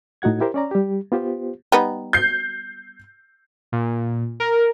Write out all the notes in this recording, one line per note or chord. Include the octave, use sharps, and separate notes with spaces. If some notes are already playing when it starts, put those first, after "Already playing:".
A2 D#4 F#4 F#5 G#6
E4 G4 A#4 C5
C#4 D5 A#5
G3 G4
B3 F4 G4 C5
G3 B3 D#4
G6 C7
A#2
A#4